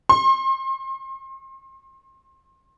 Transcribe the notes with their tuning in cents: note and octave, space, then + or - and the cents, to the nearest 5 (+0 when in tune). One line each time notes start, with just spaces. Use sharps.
C6 +35